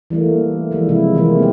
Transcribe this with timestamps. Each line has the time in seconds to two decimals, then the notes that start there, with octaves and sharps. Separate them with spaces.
0.10 E3 G3 A3 A#3
0.71 E3 F3 G3 G#3
0.89 C3 G#3 E4
1.14 D#3 E3 G3 G#3 A#3 C4
1.39 B3 G4